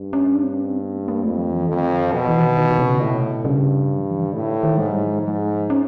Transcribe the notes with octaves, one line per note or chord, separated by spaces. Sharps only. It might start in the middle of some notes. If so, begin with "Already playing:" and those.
Already playing: G2
C#4
D4
C4
C#4
C4
B3
A#3
A#3
F2 A3
F3
E3
F2 D#3
D3
D#3
B2 F3
E3
D#3
D#3
D#3
C3
C#3
A2 C3
B2
C3
G2 C#3
F3
E3
D#3
A2 D3
D#3
G#2 G#3
G3
F3
G#2
C#4